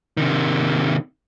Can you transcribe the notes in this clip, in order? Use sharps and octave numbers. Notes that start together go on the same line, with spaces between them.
C3 D#3